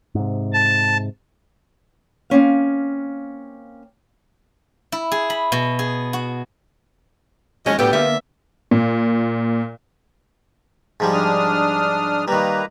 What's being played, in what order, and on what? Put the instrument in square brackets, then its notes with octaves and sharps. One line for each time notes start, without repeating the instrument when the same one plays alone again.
[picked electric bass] G#2 C3
[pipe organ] A5
[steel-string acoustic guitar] A#3 C4 C#4 F5
[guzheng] E4
G#4
B5
B2
G#4
F#4
[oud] D#2 G#3 [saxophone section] F3 F#3 C#4 [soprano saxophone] D#5
[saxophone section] D2 G3 G4 [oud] A2 E5 [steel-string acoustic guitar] B3 [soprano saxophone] G5
[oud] D3 A#3 F4 [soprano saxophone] E5
[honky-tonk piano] A#2
[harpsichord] G#2 F3 G3
[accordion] D4 D#6 F6
[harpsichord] D#3 G3 [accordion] A#3 B4 A#5